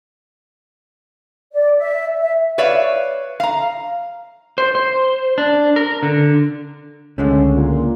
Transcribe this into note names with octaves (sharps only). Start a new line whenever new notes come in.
D5
E5
E5
B4 C#5 D5 E5 F5
F5 A#5
C5
C5
D4
A#4
D3
C#2 D3 G#3 A3 C#4
A#2